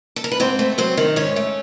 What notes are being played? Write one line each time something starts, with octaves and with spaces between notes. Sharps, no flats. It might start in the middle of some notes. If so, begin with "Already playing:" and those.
A4
A#4
B4
G#2 C4 C5
A3
F#3 C4 C5
D#3
G#2 C#4 C#5
A3